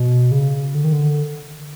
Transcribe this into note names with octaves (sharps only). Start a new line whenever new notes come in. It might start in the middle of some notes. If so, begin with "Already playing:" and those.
Already playing: B2
C#3
D3
D#3
D3